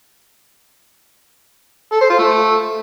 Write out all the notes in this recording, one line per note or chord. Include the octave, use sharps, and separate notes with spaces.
A4
C5
F4
A3